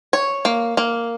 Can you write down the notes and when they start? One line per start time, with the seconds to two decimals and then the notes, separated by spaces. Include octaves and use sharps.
0.13 C#5
0.45 A#3
0.77 A#3